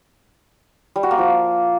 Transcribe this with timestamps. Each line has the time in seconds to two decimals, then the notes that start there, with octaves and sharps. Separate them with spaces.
0.96 G3
1.03 F#4
1.11 A#3
1.18 F3